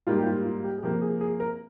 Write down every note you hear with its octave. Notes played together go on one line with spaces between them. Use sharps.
G#2 G3 A#3 F4
G4
F4
F4
G4
G#4
C3 F3 A#3 G4
G#4
G#4
A#4